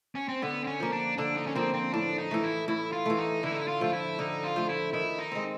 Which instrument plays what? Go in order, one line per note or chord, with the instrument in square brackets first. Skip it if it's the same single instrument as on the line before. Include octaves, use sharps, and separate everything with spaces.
[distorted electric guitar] C#4
C4
[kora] D3 [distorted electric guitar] B3
[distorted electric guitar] C4
C#4
[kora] F3 A#3
[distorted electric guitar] D4
[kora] D3 [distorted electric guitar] D4
[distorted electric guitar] D#4
C#4
[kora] F3 A#3 [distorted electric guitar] C4
[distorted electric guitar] C4
[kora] A2 [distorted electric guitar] D4
[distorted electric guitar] D#4
[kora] E3 A3
[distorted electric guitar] E4
[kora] A2 [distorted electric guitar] E4
[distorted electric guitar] F4
[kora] E3 A3
[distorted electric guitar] D#4
[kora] D3 [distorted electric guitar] E4
[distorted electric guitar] D#4
E4
F4
[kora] F3 A3 [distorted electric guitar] F4
[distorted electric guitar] E4
[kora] D3 [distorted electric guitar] D#4
[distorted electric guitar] F4
[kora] F3 A3
[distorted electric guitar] E4
[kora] D#3 [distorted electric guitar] E4
[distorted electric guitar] D#4
[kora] G#3 C4